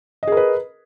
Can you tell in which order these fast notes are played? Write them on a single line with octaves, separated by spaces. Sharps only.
D#5 G#4 A#4 B4